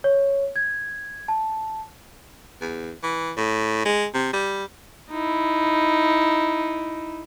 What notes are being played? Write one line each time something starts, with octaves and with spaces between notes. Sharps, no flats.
C#5
G#6
A5
E2
E3
A2
G#3
C3
G3
D#4 E4